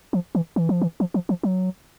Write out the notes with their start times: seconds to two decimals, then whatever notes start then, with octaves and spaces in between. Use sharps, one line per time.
0.13 F3
0.35 E3
0.56 E3
0.69 F3
0.82 E3
1.00 F3
1.14 F3
1.29 F3
1.43 F#3